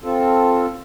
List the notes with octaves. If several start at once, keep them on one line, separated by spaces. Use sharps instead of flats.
C4 F4 A4